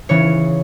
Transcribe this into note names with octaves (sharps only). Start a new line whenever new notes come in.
C#3 E3 C#5